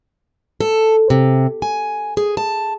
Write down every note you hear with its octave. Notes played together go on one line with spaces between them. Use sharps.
A4
C3
G#5
G#4
A5